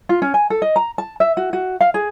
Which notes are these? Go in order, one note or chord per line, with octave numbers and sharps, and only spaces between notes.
F4
C#4
G#5
A4
D#5
A#5
A5
E5
F#4
F#4
F5
G#4